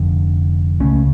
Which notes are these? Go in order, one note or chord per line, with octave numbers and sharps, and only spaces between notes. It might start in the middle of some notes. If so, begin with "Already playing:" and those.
Already playing: F1 F2 D3
C#2 C#3 A3 C#4